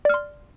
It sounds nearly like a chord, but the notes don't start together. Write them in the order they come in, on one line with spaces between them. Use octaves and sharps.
D5 F6 C6